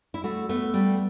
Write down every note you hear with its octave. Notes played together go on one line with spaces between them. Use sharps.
E4
A3 F#4
A3 B3
G3